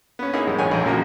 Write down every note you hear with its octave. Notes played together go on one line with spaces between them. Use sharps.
B3 C#4
A#3 D#4 E4 G#4
E2 G#2 G3 G#3
A1 G2 F4 C#5 G#5
A#1 E2 A4 G#5
A1 C#3 F3 A#3 F#4 A#5